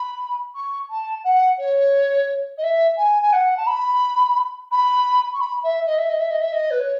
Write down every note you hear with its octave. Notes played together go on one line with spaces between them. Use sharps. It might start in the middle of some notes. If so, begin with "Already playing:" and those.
Already playing: B5
C#6
A5
F#5
C#5
D#5
E5
G#5
G#5
F#5
A5
B5
B5
C#6
B5
E5
D#5
E5
D#5
E5
D#5
E5
D#5
B4
C#5